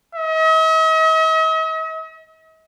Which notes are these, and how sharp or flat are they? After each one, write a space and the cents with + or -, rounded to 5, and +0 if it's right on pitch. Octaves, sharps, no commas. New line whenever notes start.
D#5 +45